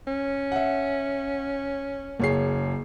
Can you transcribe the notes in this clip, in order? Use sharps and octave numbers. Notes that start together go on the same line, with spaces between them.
C#4
E5 F#5
F#1 A#3 G#4 C#5 C7